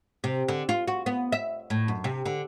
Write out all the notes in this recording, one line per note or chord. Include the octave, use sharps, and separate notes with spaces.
C3
D3
F4
F#4
B3
E5
A2
F#2
C3
D3